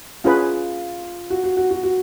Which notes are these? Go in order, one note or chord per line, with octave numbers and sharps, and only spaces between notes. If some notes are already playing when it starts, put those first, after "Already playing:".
C#4 F4 G#4 B4
F#4
F#4
F#4
F#4
F#4